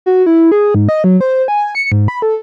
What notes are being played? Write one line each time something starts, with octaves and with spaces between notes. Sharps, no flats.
F#4
E4
G#4
G#2
D#5
F#3
C5
G#5
C#7
G#2
B5
A4